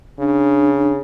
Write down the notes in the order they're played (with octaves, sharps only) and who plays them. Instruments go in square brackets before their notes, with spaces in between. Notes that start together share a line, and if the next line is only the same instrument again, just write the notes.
[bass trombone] C#3 [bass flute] D4